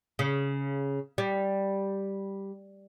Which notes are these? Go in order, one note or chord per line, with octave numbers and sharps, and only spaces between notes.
C#3
G3